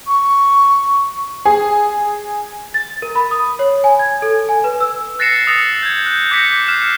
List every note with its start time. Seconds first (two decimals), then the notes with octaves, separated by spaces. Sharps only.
0.07 C#6
1.45 G#4
2.74 A6
3.02 A#4
3.15 B5
3.31 D#6
3.59 C#5
3.84 G#5
3.99 G#6
4.22 A4
4.49 G#5
4.64 B4
4.80 E6
5.19 F#6 A6 A#6 C7 C#7 E7
5.47 D#6 E6 A6 A#6 C#7
5.83 G6 G#6
6.06 F#6 G6
6.31 D6 G6 G#6 A#6 B6 C#7
6.68 F6 F#6 C7 E7